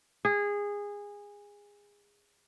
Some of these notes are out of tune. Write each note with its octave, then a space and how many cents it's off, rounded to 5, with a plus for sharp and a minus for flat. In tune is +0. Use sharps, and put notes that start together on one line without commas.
G#4 -20